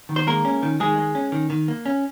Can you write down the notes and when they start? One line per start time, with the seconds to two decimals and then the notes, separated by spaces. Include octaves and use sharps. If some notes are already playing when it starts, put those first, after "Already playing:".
0.09 D#3
0.16 C5
0.27 G#3 A#3 A#4
0.45 C#4
0.63 D#3
0.80 D#3 G#3 G#4
0.98 G#3
1.15 C#4
1.32 D#3
1.50 D#3
1.68 A#3
1.86 C#4